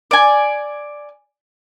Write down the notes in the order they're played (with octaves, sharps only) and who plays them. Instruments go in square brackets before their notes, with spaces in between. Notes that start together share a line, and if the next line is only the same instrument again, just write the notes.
[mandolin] D5 G#5